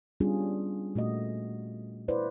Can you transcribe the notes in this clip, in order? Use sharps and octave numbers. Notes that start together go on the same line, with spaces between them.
G3 B3 C#4 D4 F4 G#4
A#2 A3 F#4 D#5
E4 B4 C5 D5